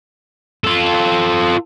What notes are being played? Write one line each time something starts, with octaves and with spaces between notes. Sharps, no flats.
F4 A4